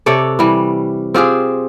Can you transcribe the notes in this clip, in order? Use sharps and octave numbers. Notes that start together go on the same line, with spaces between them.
C3 A4 C#5 D5
E3 G3
C4 F4 G4 G#4